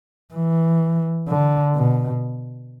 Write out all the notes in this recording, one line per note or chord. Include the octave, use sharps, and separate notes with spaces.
E3
D3
B2